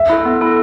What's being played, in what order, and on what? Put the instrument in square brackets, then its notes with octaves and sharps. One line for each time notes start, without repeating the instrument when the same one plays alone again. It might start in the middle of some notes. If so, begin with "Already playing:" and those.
Already playing: [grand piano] E5
[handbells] E4 A4
B3
E4 A4